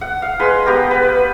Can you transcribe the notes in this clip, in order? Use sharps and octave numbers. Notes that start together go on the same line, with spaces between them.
F#5
F5
G#3 B4 C6
B3 G4 A#4
B4
B4